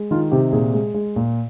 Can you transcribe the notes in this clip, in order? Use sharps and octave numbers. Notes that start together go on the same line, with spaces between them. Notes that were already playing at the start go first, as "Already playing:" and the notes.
Already playing: G#3
D#3 F4
C3 G4
A#2 G#4
G#3
G#3
A#2